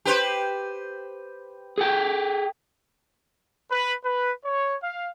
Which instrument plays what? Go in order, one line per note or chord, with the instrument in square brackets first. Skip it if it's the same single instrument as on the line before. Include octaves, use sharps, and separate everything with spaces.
[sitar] G4 B4 C5
[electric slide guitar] G#4 A4 G5
[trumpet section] B4
B4
C#5
F5